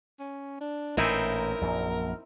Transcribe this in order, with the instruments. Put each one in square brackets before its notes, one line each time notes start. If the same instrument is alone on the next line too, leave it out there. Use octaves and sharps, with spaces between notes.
[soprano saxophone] C#4
D4
[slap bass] A1 A#2 [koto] C4 D#4 E4 [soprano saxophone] A#4
[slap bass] A#1 F#2